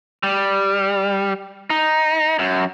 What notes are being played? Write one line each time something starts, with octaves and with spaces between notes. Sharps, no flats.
G3
D#4
F#2